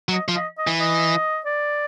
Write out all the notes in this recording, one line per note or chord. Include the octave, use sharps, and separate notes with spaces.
F#3
D#5
F3
D#5
D#5
E3
D#5
D5